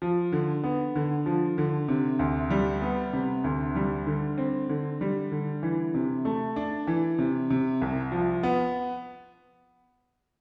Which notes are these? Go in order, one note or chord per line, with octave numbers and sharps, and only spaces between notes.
F3
D3
B3
D3
F3
D3
C3
D2
G3
B3
C3
D2
G3
D3
C4
D3
G3
D3
E3
C3
A3
D4
E3
C3
C3
C2
F3
B3